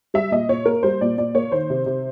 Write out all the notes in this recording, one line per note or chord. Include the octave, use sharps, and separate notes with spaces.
G3 E5
A#2 D#5
A#2 C#5
A#3 A#4
G3 C5
A#2 D5
A#2 D5
A#3 C#5
D#3 C5
C3
C3